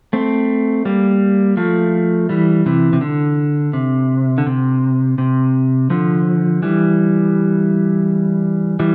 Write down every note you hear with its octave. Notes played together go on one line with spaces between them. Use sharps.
A3 C4
G3 A#3
F3 A3
E3 G3
C3 E3
C3
D3
C3
D3
C3
C3
D3 F3
E3 G3
E3 G3